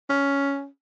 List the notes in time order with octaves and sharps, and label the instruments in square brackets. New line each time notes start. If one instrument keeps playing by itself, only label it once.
[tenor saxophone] C#4